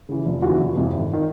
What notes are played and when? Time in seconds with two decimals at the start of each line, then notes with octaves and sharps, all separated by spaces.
0.09 C#3 E3
0.26 F1 F4
0.42 D#2 C#3 E3 F#4
0.59 F1
0.76 F2 C3 E3
0.93 G#1
1.13 D#3